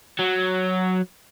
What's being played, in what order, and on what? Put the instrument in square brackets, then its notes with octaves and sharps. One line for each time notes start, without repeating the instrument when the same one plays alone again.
[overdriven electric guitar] F#3